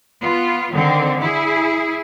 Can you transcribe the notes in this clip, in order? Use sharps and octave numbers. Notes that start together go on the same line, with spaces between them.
B3 F4
D3 D#3 C4
E4 G#4